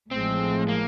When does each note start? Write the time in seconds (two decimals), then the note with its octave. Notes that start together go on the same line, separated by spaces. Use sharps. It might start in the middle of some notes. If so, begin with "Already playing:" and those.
0.11 A1 A2 F3 G#3 C4
0.68 A#3